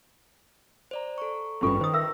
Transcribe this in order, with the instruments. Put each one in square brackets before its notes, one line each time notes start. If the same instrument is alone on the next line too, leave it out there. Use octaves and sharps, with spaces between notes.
[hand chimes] C5 D5 A#5
A4 A#5 C#6
[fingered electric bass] G#1 G2 C#4 [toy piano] F4 A4 C#6 [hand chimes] B4 G5
[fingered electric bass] D#3 [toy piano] C5 D#6
[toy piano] A#4 E5 E6 [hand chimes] C#6 A#6